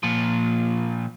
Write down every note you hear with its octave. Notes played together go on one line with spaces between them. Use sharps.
A#2 F3